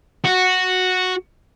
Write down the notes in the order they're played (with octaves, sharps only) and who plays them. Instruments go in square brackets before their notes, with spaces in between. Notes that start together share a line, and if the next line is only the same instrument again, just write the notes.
[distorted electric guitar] F#4